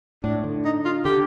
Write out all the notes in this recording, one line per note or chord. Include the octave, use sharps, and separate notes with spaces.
A2 D4
D3
D#4
F4
D3 G4